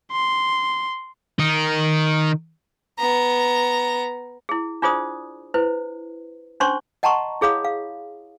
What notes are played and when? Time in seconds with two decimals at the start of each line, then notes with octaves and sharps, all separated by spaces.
0.12 C6
1.39 D#3 D#4
2.99 B3 A#5
4.49 E4 G#4
4.82 D4 F4 G#4 C5 D5 D#6
5.54 E4 B4 C5
6.60 C#4 D4 C5 C6 C#6
7.03 D#5 F#5 A5 A#5 C6 C#6
7.41 E4 G#4 C#5 F5 B5 D#6
7.65 F5